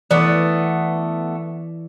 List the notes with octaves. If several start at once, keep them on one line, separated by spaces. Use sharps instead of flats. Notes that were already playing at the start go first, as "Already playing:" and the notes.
E3 A3 B3 D5